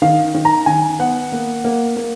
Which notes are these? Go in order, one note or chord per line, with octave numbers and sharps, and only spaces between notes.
D#3 F5
D#3
A#5
D#3 G#5
B3 F#5
A#3
A#3
A#3